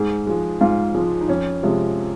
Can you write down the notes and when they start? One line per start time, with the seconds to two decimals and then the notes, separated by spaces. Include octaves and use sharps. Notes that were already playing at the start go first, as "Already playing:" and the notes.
Already playing: G#2 G#4
0.27 F3 G#3
0.61 G#2 F4
0.95 F3 G#3
1.21 D#4
1.28 F2 C#4
1.63 C3 F3 G#3